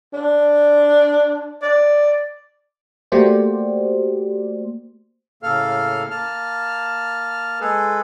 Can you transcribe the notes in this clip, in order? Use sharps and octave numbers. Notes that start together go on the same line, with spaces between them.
D4
D5
A3 A#3 F#4 G4 C5 D5
A2 C#3 A#3 A4 F5 F6
A#3 A5 F6
G#3 G#4 A4 B4